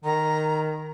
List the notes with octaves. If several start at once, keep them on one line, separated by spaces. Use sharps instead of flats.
D#3 A#5